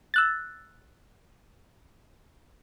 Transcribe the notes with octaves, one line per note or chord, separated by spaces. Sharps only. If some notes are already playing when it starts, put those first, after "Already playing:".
E6 F#6 A6